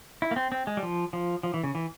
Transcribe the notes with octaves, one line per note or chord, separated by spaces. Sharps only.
E4
A#3
C4
C4
G#3
G3
F3
F3
F3
E3
C#3
E3